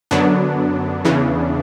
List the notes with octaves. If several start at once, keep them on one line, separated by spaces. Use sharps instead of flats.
F#2 D3 F#3 B3 D4
E2 C#3 E3